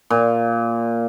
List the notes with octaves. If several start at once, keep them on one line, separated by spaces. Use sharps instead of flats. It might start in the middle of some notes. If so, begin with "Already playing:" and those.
A#2